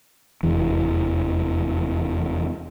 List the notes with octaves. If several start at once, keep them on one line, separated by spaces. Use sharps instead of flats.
F1 E2 E3